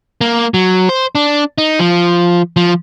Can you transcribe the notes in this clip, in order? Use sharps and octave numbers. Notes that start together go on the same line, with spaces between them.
A#3
F#3
C5
D4
D#4
F3
F3